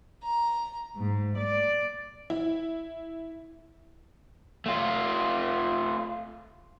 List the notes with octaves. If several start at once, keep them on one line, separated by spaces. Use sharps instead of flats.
A#5
G#2
D5
E4
A3 F4